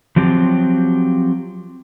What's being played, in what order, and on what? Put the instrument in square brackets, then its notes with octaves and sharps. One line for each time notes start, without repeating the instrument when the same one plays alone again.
[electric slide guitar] F3 F#3 C4 G4